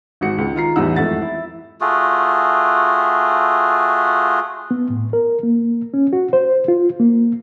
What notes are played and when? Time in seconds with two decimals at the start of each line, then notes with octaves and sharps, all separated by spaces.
0.21 G#1 F#4 C#7
0.38 C#2
0.55 D#3 F4 A#5 C7
0.76 A1 E2 G3 D#4 F#5 E6
0.96 G#1 F2 A3 F#5 A6
1.22 E4
1.81 A3 F4 F#4 G#4
4.71 B3
4.90 A2
5.13 A#4
5.43 A#3
5.94 C#4
6.13 F#4
6.33 C5
6.68 F4
7.00 A#3